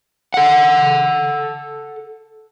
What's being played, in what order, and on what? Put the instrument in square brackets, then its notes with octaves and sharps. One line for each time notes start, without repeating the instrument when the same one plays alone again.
[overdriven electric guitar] A4 F#5